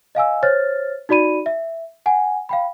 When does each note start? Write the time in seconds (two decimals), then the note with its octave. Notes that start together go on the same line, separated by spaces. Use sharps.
0.15 D#5 F5 G#5 E6
0.43 C5 C#5 F6 A6
1.09 D#4 F#4 D5 B5 D#7
1.46 E5
2.06 F#5 G#5
2.49 F5 G5 B5